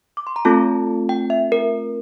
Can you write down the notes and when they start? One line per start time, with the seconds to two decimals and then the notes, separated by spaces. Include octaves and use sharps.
0.17 D6
0.27 C6
0.36 A#5
0.45 A3 C4 F4 A4 A5
1.09 G5
1.30 E5
1.52 A#4